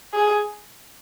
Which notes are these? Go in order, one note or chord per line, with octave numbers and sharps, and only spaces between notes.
G#4